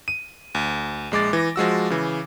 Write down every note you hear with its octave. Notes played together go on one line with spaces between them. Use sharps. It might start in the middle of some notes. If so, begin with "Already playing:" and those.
D#7
D2
A#1 G#3 D6 A6
E3 A#6
F3 G#3 F#4 E6
C#3 E3